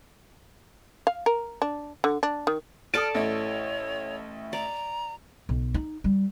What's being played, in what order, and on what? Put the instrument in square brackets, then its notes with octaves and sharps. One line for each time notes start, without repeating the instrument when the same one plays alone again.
[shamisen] F5
A#4
D4
D3
D4
D#3
[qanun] A4 D5 A5 [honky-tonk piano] D#6 D7 [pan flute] F6
[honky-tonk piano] A1 A3 E4 [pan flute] C#5
[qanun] D5 [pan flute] A#5
[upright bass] B1
D#4
G3